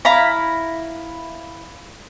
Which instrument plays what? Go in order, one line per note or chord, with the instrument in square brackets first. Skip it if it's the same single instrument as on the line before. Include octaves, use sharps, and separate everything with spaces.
[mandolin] E4 F5 A#5 B5